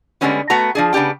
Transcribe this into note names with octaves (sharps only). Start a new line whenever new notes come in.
D3 G3 G#3 B3 C#4 F#4
A3 B3 F#4 A#5
F3 D4 G#4
C#3 B3 D4 G4 G5